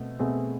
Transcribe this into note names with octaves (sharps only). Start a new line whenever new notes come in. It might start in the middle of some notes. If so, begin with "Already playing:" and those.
Already playing: B2 A3 C4
B2 A3 C4 G#4